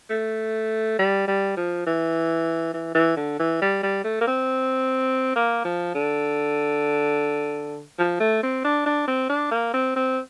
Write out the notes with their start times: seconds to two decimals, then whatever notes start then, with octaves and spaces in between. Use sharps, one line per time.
0.10 A3
0.99 G3
1.28 G3
1.57 F3
1.86 E3
2.73 E3
2.95 E3
3.17 D3
3.40 E3
3.61 G3
3.83 G3
4.04 A3
4.21 A#3
4.27 C4
5.36 A#3
5.65 F3
5.94 D3
7.99 F3
8.20 A3
8.43 C4
8.65 D4
8.86 D4
9.08 C4
9.29 D4
9.51 A#3
9.74 C4
9.96 C4